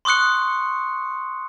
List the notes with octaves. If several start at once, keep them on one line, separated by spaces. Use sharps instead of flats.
C6 C#6 D#6 F#6 C#7